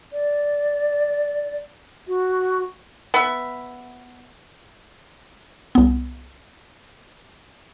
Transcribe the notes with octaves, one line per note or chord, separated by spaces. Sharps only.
D5
F#4
B3 E5
C2 B3